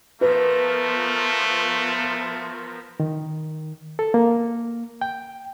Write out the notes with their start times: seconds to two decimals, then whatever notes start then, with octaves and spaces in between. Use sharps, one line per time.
0.21 F3 A3 B3 A#4 B4
3.00 D#3
3.99 A4
4.14 A#3
5.01 G5